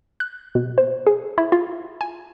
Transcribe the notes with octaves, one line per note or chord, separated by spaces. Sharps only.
F#6
B2
C5
G#4
E4
F4
G#5